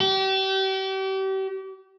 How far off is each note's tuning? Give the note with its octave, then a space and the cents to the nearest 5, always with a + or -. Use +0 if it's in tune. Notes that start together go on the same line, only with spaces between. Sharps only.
G4 -35